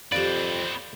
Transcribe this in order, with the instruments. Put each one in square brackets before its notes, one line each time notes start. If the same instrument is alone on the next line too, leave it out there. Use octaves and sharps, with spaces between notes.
[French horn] F2 [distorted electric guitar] C4 B4 [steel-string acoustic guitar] G4 F5 [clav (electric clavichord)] D5